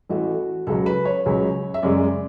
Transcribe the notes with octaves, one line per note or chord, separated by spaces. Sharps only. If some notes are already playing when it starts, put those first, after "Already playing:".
A1 A2 E3 A3 F#4
C#2 C#3 F#3 A4
B4
C#5
C#2 C#3 F#3
E5
F#2 C#3 G#3 D5